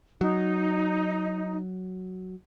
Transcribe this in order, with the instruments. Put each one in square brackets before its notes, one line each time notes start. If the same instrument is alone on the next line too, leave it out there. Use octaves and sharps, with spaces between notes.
[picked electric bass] F#3 [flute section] D#4